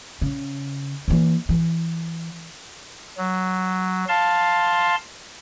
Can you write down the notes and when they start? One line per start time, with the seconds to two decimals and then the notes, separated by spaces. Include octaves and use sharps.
0.21 C#3
1.08 E3 A#3
1.49 E3
3.17 F#3
4.09 F5 A5 C6